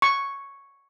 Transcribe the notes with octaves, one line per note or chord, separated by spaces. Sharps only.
C#6